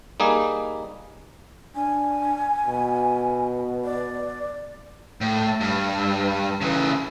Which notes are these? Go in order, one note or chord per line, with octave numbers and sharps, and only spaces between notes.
G3 A#3 D#4 G#4
D4 G#5
B2
D5
A2
G2
C#3 E3